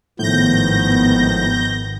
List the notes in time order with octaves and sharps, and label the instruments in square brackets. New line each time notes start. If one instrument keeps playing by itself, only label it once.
[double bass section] G#1 D#3 B3 [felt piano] A2 [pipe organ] F3 [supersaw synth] G6 A#6